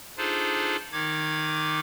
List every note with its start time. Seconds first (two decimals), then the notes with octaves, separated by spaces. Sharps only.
0.17 D4 D#4 F4 G#4 A4 C5
0.92 D#3 D#4 D6 G#6